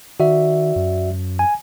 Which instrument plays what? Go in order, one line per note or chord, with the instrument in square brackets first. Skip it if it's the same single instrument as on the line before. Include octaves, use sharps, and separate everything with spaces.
[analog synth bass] D#3 [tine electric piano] F#4 D5 E5
[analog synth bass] F#2
[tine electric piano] G#5